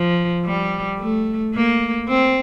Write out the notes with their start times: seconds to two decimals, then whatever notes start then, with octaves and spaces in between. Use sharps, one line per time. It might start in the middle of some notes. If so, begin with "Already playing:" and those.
Already playing: F3
0.45 G3
0.99 A3
1.54 A#3
2.09 C4